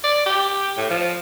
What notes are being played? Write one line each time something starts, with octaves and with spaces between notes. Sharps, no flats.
D5
G4
A2
F3